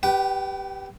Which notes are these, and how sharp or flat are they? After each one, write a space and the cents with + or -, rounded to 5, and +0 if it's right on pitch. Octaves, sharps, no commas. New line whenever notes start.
G4 +0 B4 +0 G5 -40